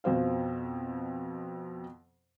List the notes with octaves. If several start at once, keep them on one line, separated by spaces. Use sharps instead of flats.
F2 B2 C5 F5